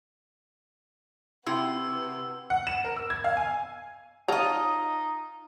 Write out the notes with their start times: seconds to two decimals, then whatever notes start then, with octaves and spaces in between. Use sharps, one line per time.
1.47 C3 E4 F#4 B4 E6
2.50 F#5
2.67 E7
2.84 A#4
2.96 E6
3.10 G#6
3.24 F5
3.37 G#5
4.28 D#4 F4 C#5 D#5 A5 A#5